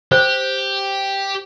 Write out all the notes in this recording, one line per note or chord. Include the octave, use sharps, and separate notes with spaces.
G4 C5